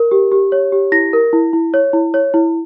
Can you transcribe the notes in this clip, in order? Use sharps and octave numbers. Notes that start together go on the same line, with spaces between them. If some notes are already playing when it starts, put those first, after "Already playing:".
Already playing: A#4
G4
G4
C#5
G4
E4 A#6
A#4
E4
E4
C#5
E4
C#5
E4